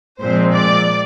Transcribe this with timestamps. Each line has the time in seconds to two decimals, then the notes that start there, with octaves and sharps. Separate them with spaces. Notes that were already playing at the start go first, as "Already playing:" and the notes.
0.20 A#2 F3 G#3 C4 C5
0.52 D5